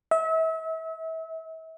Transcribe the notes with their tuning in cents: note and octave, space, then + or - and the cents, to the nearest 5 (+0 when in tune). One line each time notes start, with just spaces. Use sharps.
E5 -35